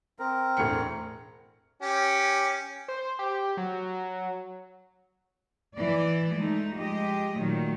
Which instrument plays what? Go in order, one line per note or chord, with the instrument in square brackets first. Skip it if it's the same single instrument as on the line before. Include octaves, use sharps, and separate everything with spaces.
[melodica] C4 A#4
[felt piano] E1 A2 C#7
[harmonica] C#4 G4
[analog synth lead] C5
G4
F#3
[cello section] E3 D5
G#3 A3 D#4
F3 G#3 G4 D#5
A#2 D#3 F#3 A3